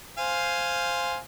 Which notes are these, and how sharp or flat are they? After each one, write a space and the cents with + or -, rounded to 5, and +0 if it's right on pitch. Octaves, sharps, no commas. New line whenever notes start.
C5 +0 F5 +0 G#5 +0